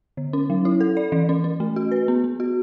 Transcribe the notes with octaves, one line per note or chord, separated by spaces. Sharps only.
D3
C#4
F#3
E4
A4
D5
E3
C#4
C#4
A3
F#4
B4
B3
B3
F#4